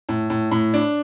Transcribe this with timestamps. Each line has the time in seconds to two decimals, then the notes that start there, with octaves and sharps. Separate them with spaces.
0.09 A2
0.30 A2
0.51 A2
0.74 D4